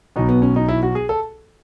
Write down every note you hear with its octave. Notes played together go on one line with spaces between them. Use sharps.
B1 B2 D#4
B3
C#4
D#4
E4
F#4
G#4
A4